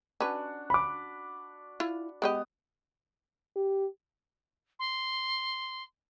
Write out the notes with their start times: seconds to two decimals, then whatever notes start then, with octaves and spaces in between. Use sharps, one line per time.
0.20 C#4 D4 F#4 B4
0.70 B5 D6
1.80 E4 F4
2.22 G#3 B3 G4 D#5 D#6
3.56 G4
4.79 C6